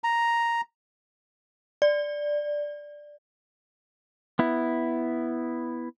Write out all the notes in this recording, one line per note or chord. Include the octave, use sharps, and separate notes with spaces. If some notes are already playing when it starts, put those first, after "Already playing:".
A#5
D5
B3 E4